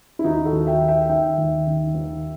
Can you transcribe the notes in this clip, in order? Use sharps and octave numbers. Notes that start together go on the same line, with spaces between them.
E4
D#2 D#4 F#4
F#4 A4
D#2
E5 G5
D#3
E5 G5
D#3 E5 G5
D#2
D#3
D#2